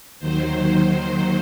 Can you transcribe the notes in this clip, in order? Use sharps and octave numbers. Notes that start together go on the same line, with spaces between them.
D#2 D#3 F#3 C5